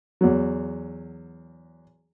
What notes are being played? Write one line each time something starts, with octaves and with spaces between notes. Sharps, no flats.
E2 F#3